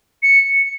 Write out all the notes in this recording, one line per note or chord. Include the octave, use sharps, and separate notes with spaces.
C#7